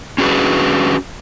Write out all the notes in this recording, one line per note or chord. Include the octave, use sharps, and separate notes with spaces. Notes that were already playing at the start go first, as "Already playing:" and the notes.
C#4 D4 F#4 G#4 B4